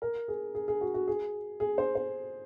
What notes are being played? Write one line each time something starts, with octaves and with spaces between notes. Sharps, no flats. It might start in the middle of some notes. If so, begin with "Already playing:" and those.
A#4
G#4
G#4
G#4
F#4
F#4
G#4
G#4
C5
C5